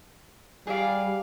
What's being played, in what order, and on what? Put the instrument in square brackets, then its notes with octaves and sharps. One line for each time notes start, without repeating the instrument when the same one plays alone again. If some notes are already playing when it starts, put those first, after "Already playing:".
[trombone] G3 [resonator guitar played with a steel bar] G#4 D5 [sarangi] F5